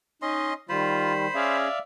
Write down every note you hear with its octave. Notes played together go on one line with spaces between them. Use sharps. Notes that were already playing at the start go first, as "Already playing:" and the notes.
C#4 D#4 D#5 C6
D#3 G3 F4 C5 B5
C#4 G#4 D5 E5 F5